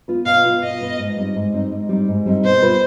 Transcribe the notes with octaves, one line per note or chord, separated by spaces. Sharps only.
B3 F4 B4
B2 F5
B3 F4 B4
B2 D#5
B3 F4 B4
G#2
G3 C4 D#4
G#2
G3 C4 D#4
G#2
G3 C4 D#4
G#2
G3 C4 D#4
B2 C5
B3 F4 B4